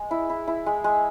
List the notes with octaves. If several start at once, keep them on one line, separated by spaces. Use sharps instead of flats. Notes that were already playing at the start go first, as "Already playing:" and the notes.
Already playing: G#3
E4
E4
E4
G#3
G#3